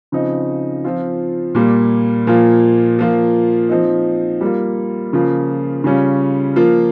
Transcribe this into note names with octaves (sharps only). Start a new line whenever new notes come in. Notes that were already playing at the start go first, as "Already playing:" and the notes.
C#3 F3 C4 D#4
F3 C4 F4
A#2 G3 A#3
A#2 F3 A#3 F4
F3 A#3 F4
F3 C4 D#4
G3 A#3 F4
C#3 F3 A#3 F4
C#3 G3 C#4 F4
F3 A#3 F4